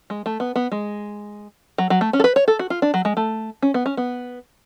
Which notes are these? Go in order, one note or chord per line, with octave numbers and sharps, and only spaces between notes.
G#3
A3
B3
B3
G#3
F#3
F#3
A3
C#4
A4
B4
C#5
A4
F#4
F4
D4
F#3
G#3
A3
C#4
B3
C#4
B3